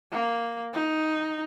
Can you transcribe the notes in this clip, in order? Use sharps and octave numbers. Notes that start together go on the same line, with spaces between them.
A#3
D#4